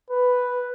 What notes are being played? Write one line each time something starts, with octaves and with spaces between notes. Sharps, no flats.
B4